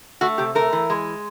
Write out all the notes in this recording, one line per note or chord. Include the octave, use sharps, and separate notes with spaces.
A3 F#4
C3 G4
A3 A#4
E3
G#3